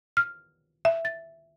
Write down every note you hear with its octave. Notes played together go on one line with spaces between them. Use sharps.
F6
E5
A6